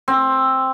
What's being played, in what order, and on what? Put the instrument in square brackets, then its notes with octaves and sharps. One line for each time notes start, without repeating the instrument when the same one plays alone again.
[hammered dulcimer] C4